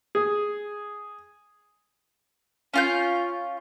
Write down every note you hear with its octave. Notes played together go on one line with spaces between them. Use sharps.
G#4
C#4 F4 G6